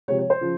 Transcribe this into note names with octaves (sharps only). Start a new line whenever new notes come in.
C3 F3 G#3 C#5
C#5
C5
C#3 F3